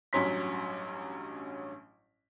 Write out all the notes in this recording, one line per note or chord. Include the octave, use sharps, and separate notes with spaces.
A1 G2 F#3 C#4 C6 B6